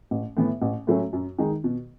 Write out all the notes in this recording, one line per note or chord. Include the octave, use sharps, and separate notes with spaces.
A1
A2 E3 B3
A1
A2 F#3 A3 C#4
F#2
D#3 G#3 D#4
B2